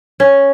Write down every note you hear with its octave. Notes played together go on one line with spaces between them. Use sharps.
C#4